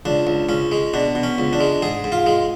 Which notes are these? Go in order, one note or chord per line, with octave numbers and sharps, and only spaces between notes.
C#2 D4
C#2
C#2 C#4
G#3
B2 D4
B2
C#4
C#2
D4
G#3
G#2 G#4
G#2
F4
G#3